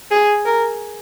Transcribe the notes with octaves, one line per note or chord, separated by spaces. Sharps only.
G#4
A#4